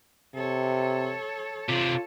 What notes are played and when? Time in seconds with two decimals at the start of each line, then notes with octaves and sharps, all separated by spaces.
0.35 C3 A4 C#5
1.69 C3 D4 F4